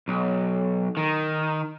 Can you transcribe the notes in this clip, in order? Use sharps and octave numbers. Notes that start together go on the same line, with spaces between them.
B1
D#3